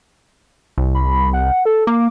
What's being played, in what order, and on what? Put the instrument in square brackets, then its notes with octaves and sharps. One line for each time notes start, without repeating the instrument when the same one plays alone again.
[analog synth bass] C2
[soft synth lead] B5
F#5
A4
[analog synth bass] A#3 [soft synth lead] D6